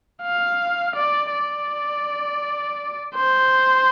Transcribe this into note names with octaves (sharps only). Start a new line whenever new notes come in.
F5
D5
D5
C5